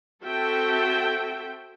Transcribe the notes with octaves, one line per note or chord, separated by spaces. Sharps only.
C4 F#4 A4 E5 G5